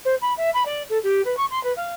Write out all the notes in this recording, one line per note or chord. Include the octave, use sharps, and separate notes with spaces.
C5
B5
E5
B5
D5
A4
G4
B4
C#6
C6
B4
F5